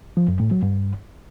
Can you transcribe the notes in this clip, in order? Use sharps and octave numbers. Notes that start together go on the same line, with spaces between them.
F3
F#2
A2
F#3
G2